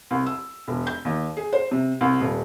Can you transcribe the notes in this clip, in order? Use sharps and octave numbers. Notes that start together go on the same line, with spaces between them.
C2
E6
E1
G6
D#2
G#4
C5
C3
C2
D#1